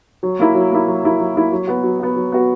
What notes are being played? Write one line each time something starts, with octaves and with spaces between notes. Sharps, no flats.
F#3
A#3 E4
F#3
A#3 E4
F#3
A#3 E4
F#3
A#3 E4
F#3
B3 F#4
F#3
B3 F#4
F#3
B3 F#4